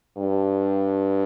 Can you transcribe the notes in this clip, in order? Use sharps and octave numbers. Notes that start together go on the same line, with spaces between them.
G2